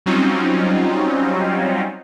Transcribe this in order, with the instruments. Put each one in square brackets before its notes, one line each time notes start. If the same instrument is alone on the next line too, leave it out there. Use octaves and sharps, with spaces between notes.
[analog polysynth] F#3 G3 C4 C#4 D#4 F4